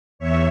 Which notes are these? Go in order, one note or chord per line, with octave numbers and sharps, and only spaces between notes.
E2 C#5 E5